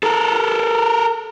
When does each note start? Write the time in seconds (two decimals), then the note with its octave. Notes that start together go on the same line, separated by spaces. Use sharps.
0.03 A4 A#4